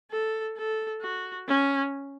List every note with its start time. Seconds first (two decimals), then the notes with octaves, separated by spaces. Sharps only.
0.11 A4
0.57 A4
1.02 F#4
1.48 C#4